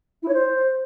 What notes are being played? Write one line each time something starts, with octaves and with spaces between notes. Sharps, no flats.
E4
C#5
C5